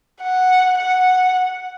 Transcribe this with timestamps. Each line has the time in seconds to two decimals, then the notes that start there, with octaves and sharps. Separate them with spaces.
0.22 F#5
0.78 F#5